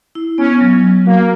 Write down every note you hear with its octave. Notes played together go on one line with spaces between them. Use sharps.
E4
B3 C#4
F#3
F#3
A#3 F#4